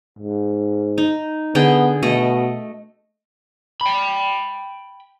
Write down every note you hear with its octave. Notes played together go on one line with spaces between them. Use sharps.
G#2
D#4
D3 B3 G#4 G5
B2 A3 D#5
G5 B5